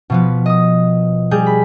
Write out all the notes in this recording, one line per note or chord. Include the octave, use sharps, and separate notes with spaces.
B2 F3 B3
D#5 D#6
G3 G#4 G6
B5